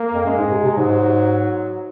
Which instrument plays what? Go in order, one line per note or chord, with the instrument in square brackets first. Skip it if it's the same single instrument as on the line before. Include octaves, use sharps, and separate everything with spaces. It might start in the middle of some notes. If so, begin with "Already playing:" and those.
Already playing: [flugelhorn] A#3
[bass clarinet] F2
[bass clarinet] F#2 [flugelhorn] G#3
[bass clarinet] G#2
C3
C3
[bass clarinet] G#2 [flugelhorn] F#3